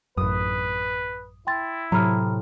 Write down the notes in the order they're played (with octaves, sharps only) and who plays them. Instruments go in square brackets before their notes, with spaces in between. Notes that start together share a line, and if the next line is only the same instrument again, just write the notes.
[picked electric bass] A1 F#2 [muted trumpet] B4 [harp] D#6
[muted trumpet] E4 [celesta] G5 C6 A6
[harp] A2 C3 [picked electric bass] F#3 [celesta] A#5 B5 F6